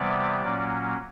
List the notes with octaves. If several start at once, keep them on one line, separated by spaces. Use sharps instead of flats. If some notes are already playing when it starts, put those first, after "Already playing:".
Already playing: C3 E3 G3 B3 D5
A#2 F#3 A#3 C#4